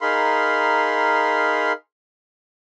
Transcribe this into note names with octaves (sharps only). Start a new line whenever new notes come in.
D#4 G#4 A#4 F5 B5 C6